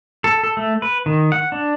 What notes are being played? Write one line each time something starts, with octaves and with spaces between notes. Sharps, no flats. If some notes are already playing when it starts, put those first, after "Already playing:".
A4
A4
A3
B4
D#3
F#5
D4